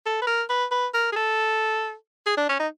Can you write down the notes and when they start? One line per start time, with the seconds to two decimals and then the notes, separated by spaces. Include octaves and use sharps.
0.06 A4
0.22 B4
0.27 A#4
0.50 B4
0.71 B4
0.94 A#4
1.12 G#4
1.16 A4
2.26 G#4
2.37 D4
2.49 C#4
2.60 D#4